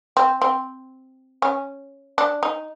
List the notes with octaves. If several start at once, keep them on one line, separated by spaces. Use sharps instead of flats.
C4
C4
C#4
D4
D#4